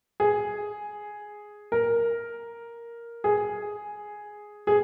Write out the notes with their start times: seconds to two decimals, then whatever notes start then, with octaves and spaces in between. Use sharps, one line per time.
0.20 G#4
1.72 A#4
3.24 G#4
4.67 G#4